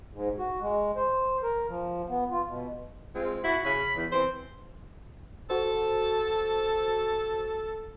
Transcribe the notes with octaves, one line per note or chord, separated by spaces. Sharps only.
G#2
F#4
G#3
C5
A#4
F3
B3
F4
B2
G#3 C4 F4
E4 F#4
C#3 C#4 B5
E2
E3 C4 C5
F#4 A4 C5